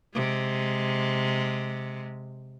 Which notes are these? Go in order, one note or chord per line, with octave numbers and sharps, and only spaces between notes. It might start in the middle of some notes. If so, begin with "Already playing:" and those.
C3 G#3